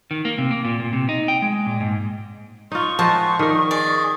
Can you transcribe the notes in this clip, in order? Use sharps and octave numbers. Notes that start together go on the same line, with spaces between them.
D#3
A#3
C3
A#3
A#2
A#2
C3
D#4
G5
G#3
A#2
G#2
D#4 F4 C#6
F3 G#3 C5 D#5 F#5 A5
D#3 D#4 A#4 D5 D#5
G#4 D5 D#5